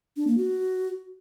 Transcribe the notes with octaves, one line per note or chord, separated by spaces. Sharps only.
D4
A#3
F#4